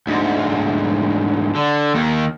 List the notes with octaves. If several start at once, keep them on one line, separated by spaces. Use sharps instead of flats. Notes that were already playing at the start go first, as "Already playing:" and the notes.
D2 G#2
D3
D#2 D#3